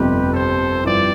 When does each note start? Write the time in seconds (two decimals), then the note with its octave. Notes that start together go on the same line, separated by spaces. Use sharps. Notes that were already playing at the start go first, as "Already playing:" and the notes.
Already playing: G1 F2 C3 G3 G4 B4
0.32 A4 C5
0.84 G2 F3 C4 E4 D5